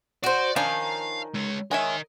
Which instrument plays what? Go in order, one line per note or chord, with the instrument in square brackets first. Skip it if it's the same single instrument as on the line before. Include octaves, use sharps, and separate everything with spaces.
[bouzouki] F#4 C5 [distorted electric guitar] D5
[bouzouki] D#3 [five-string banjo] F3 C#4 D4 [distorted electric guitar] F5
[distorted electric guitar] G#3 C#4
[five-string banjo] G#3 C#5 E5 [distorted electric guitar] A#4 D#5